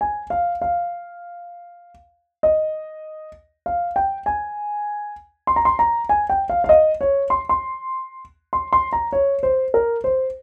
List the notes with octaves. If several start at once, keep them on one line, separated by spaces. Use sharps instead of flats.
G#5
F5
F5
D#5
F5
G5
G#5
C6
A#5
C6
A#5
G#5
G5
F5
F5
D#5
C#5
C6
C6
C6
C6
A#5
C#5
C5
A#4
C5